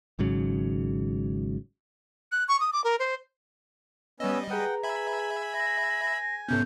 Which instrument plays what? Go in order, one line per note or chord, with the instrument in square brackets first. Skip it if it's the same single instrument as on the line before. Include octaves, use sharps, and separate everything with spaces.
[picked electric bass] G#1 G#2 C#3 F#3
[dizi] F#6
C#6
D#6
D6
A#4
C5
[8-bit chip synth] G3 D#5 [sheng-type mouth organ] B3 C#4 E6
[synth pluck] G#4 B4 [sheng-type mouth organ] F#5 G5 [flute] A#5
[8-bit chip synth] E5 B5 [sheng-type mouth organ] G#5
[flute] A#6
[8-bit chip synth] G#2 C3 C#4 [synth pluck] B3 A4 [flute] G6